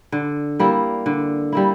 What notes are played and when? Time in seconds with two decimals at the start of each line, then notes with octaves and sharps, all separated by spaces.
0.12 D3
0.59 G3 A#3 E4
1.06 D3
1.52 G3 A#3 E4